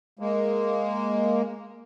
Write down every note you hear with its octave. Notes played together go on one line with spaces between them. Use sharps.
G#3 A#3